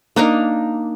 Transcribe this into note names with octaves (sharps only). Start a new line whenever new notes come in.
A#3 D4 D#4 A#4